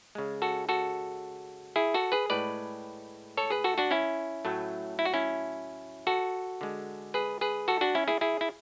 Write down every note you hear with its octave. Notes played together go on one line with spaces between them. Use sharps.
C#3 G#3
F#4 A4
F#4 A4
E4 G#4
F#4 A4
G#4 B4
A2 G#3 B4 D5
A4 C#5
G#4 B4
F#4 A4
D4 F#4
C#4 E4
A2 F#3 A3
E4
F#4
C#4 E4
F#4 A4
D3 G#3
G#4 B4
G#4 B4
F#4 A4
D4 F#4
C#4 E4
E4 G#4
E4 G#4
E4